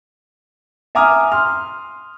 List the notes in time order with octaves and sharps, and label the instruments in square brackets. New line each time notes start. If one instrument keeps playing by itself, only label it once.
[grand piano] E5 G#5 A#5 D6 D#6 F6
C6 F6